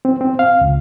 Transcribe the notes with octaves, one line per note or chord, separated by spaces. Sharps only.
C4
C4
F5
C#2